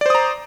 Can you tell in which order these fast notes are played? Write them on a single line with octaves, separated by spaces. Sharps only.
D5 C5 D#6 A#5